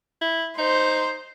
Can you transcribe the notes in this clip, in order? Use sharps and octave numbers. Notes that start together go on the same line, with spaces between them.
E4
D#4 C5